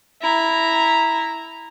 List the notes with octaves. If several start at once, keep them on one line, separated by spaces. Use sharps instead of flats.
E4 A#5